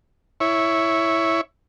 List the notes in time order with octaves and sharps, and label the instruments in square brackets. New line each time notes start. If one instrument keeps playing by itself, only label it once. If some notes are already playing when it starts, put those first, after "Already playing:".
[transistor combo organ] E4 C#5